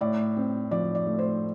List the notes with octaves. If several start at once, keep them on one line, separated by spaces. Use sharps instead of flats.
A2 D5
C4
F3 D5
D5
A3
C5